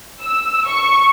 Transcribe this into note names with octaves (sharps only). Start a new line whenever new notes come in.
E6
C#6